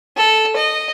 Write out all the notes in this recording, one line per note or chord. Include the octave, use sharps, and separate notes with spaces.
A4
D#5